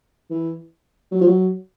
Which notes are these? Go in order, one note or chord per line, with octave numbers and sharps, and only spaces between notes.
E3
F#3
F3
F#3